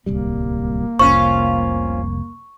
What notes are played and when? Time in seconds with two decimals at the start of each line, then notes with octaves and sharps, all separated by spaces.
0.06 D1 C2 G3 A#3
0.99 F1 C2 C#4 F4 C5 C#6